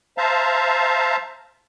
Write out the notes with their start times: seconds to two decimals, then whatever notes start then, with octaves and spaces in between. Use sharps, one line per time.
0.18 C5 E5 F5 A5 A#5